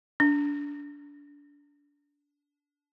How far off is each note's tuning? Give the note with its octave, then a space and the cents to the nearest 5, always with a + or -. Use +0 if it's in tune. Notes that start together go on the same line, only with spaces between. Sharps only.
D4 -25